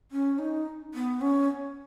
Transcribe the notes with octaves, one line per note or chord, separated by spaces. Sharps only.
C#4
D#4
B3
C#4